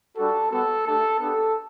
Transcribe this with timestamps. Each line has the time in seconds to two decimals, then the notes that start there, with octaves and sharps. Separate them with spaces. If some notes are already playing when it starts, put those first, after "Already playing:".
0.16 G3 D4 F#4 A4
0.51 G3 B3 F#4 A4
0.86 A3 D4 G4 A4
1.19 B3 D4 G4 A4